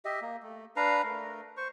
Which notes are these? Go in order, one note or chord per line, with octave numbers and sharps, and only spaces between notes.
G4 D#5 E5
A#3
A3
D4 B4 F5 A#5
A3 A#4
C5 C#6